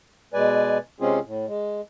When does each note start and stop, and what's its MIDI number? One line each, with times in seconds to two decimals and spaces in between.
0.34 0.78 47
0.34 0.78 56
0.34 0.78 71
0.34 0.78 74
0.34 0.78 80
1.01 1.19 48
1.01 1.19 56
1.01 1.19 60
1.01 1.19 61
1.01 1.19 65
1.01 1.19 68
1.25 1.46 45
1.47 1.81 56